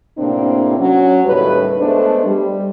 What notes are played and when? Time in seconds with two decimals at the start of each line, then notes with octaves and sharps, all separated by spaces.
0.18 A2 C3 A#3 C4 D4
0.78 F#3 C#4
1.25 D#2 A2 C#3 G3 B4
1.80 G#3 A3 B3 D4 C5
2.26 G3